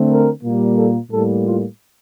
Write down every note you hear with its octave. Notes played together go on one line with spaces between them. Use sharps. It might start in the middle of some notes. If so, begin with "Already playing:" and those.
Already playing: D3 A3 C4
A#4
A#2 G3 A#3
A4
A2 G3 A#3 A4
F4